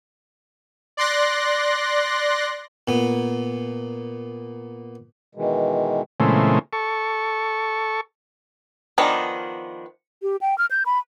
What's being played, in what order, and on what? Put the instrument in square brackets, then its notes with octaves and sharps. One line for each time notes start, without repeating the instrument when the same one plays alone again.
[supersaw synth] D5 C6 F#6 A#6
[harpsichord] A#2 B3
[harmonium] B2 D#3 E3 G#3
[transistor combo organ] A#2 C#3 E3 G#3 A3 C4
A4 C#6
[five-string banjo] D#3 F3 B3 D4 D#4
[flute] G4
G5
F6
G6
B5